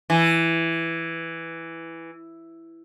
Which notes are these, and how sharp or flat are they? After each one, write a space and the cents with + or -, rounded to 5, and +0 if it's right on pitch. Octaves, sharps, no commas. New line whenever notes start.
E3 +5